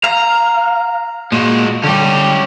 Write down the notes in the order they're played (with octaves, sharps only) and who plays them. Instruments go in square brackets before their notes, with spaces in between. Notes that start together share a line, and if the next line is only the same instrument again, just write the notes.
[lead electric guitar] F5 [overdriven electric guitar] A#5
[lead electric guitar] A#2 [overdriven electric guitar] G#3 F#4
[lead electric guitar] D3 G3 [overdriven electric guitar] C#4 G4